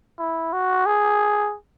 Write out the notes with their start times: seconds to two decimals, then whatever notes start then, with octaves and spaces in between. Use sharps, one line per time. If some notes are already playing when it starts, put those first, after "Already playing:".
0.19 E4
0.53 F#4
0.86 G#4